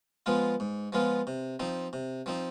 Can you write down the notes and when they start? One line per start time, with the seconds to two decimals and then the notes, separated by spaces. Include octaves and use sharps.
0.26 F3 G#3 B3 F4
0.60 G#2
0.93 F3 G#3 B3 F4
1.27 C3
1.60 F3 C4 D#4
1.93 C3
2.26 F3 C4 D#4